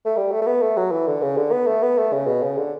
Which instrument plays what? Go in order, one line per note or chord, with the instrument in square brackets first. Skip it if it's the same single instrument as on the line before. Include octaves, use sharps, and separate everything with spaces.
[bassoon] A3
G3
A3
A3
B3
A3
F#3
E3
D3
C#3
D3
B3
A3
B3
A3
C#3
B2
C#3
D3